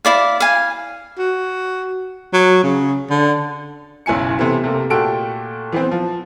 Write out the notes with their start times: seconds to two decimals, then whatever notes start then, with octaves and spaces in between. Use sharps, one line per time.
0.05 E4 D5 F5
0.40 F5 G#5
1.18 F#4
2.33 F#3
2.63 C#3
3.10 D3
4.06 F#1 B1 E4 G#5 C#7
4.39 C3 E3 A3 B3 E4
4.64 C3 A3 A#3
4.90 A#2 A3 F#4 G4 A4 D7
5.72 E3 B3 C4
5.91 F3